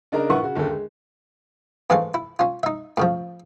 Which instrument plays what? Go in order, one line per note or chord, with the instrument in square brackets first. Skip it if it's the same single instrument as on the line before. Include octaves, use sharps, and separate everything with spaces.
[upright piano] C#3 D4 D#4 A#4 A#5
A#1 E4 A#4 B4 F#5 C#6
C#3 F#4
G1 D#2 C#3 A4
G#3
[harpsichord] G#2 E3 G#3 A3 C#4 F5
E4
C#4 F4
D#4 E5
A2 C#3 F3